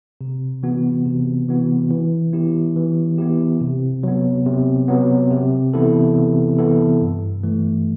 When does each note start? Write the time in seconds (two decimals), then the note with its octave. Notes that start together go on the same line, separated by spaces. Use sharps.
0.21 C3
0.63 E3 B3 F#4
1.05 C3
1.48 E3 B3 F#4
1.91 E3
2.33 B3 E4 G4
2.76 E3
3.18 B3 E4 G4
3.61 C3
4.03 F#3 B3
4.46 C3
4.88 F#3 B3
5.31 C3
5.74 E3 B3 E4 A4
6.16 C3
6.58 E3 B3 E4 A4
7.01 G2
7.43 E3 A3